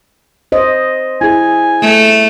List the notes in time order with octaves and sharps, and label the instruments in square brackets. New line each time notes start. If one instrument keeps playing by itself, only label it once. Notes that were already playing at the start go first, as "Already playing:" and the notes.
[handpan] C5 D#5
[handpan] E4 G#4 [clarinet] G#5
[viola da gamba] A3